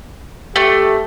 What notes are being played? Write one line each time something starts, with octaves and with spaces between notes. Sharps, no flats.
A3 G4